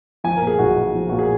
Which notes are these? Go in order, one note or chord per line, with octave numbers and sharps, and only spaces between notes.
F3 G#5
A#4
A#2
G#4
B1 F#4
B1
F3
A#2 F#4
G#4